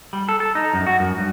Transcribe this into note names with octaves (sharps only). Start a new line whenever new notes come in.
G3
A4
A4
D#4
F#2
F#4
F#2
G2